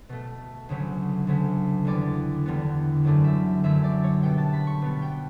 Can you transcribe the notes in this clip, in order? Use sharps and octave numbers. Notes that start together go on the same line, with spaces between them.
B2 A3
D2 C#3 F#3 A3
D2 C#3 F#3 A3
E2 D3 G3 B3 D5
E2 D3 G3 B3
F#2 D3 F#3 A3 D5
E5
F#2 D3 F#3 A3 E5
D5
C#5
B2 G3 B3 G5
A5
B5
C#6
B2 G3 B3
G5